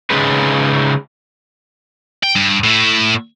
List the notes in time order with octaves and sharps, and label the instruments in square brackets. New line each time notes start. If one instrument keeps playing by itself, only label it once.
[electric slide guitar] C#3 G#3 D#4 G#4 B4
[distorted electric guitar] G5
G2
A2 E4